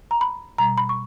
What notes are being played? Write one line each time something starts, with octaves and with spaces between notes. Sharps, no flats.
A#5
B5
B2 G3 A#5
B5
C#6